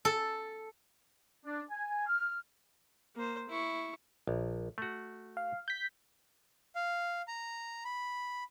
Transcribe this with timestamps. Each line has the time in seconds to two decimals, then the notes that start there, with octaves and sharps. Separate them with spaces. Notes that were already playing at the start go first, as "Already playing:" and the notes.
0.05 A4
1.45 D4
1.70 G#5
2.06 F6
3.16 A#3 C5
3.49 E4 C#6
4.27 A#1
4.78 A3 F#4
5.37 F5
5.68 G6 B6
6.75 F5
7.28 A#5
7.85 B5